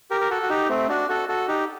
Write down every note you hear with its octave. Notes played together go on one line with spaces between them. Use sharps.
G4 A#4
A#4
F#4 A4
F#4
D#4 G4
A3 C4
D4 F#4
F#4 A4
F#4 A4
D#4 G4